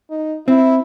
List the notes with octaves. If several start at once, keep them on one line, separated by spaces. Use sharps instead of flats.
D#4
C4 E4